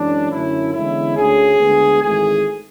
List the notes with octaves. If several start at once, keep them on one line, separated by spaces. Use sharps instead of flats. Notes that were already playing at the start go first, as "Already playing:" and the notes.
Already playing: F#2 E3 G#3 C#4 D4
F#2 D3 A3 C#4 E4
E2 D3 G#3 C#4 E4
D2 D3 A3 C#4 G#4
D2 D3 G#3 B3
G#1 G#2 E3 A3 G#4